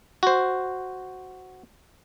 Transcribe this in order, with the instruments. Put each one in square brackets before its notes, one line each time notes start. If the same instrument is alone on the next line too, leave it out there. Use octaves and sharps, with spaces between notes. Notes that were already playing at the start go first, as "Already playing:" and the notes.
[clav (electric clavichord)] F#4 C5